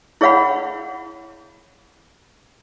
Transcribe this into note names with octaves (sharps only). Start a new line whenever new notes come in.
E4 G#4 C#5 F5 F#5 B5